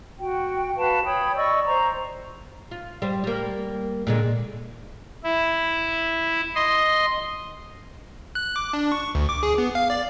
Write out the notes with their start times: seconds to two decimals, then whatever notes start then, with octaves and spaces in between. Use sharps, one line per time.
0.19 F#4 G5
0.76 F#4 B4 F5 A5
1.05 C#5 G5 B5 D#6
1.36 D5 D#5 C#6 E6
1.66 C5 A#5 C#6
2.71 F4
3.02 G3 C5
3.24 G3 A#3
4.07 A#2 D3 G#3
5.24 E4
6.55 D#5 C6
8.35 F#6
8.56 D6
8.73 D4
8.92 C#6
9.15 D2
9.29 D6
9.43 G#4
9.58 B3
9.75 F5
9.90 D5